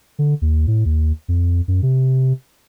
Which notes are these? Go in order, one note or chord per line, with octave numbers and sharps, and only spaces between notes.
D3
D#2
A2
D#2
F2
F#2
C3